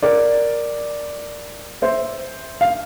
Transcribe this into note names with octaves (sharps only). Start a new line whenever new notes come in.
A#4 D5
C5 E5
F5